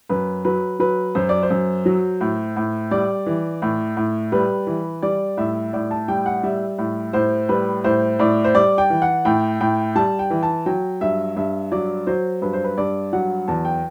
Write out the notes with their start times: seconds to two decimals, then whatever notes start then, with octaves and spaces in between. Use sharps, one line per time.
0.09 F#2 B4
0.45 F#3 B4
0.79 F#3 B4
1.15 F#2 C5
1.29 D5
1.43 C5
1.50 F#2
1.85 F#3
2.21 A2
2.56 A2
2.91 G3 D5
3.26 E3
3.62 A2
3.97 A2
4.32 G3 B4
4.67 E3
5.02 G3 D5
5.37 A2 E5
5.73 A2 D5
5.91 A5
6.08 G3 G5
6.26 F#5
6.43 G3 E5
6.78 A2
7.13 A2 C5
7.49 G3 B4
7.84 A2 C5
8.19 A2 D5
8.44 C5
8.54 G3 D5
8.78 G5
8.90 E3
9.02 F#5
9.25 A2 G5
9.61 A2 G5
9.95 G3 A5
10.19 G5
10.30 E3
10.43 A5
10.66 F#3 G5
11.01 G2 E5
11.36 G2 E5
11.72 F#3 D5
12.07 F#3 C5
12.42 G2 B4
12.53 C5
12.64 B4
12.77 G2 D5
13.13 F#3 F#5
13.48 E2 A5
13.65 G5